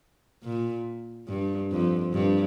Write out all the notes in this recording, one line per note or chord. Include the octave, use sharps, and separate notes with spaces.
A#2
G2
F2
G2